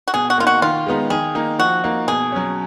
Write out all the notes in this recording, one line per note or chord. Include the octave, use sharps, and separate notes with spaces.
F#4
B2 G#4
F#4
A#3 D#4 F4
F#4
D#3 F4
G#3 B3 D#4
D#3 G#4
A#3 D#4
F3 F#4
A#3 D#4
B2 G#4
F#3 C#4